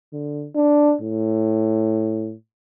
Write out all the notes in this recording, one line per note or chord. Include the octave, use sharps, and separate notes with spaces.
D3
D4
A2